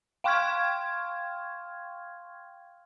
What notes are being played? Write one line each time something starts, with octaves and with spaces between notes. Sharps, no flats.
F5 G5 C6 C#6 F6 G#6